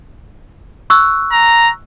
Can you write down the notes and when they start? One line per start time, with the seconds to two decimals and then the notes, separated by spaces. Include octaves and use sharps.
0.90 C#6 E6 F#6
1.32 A#5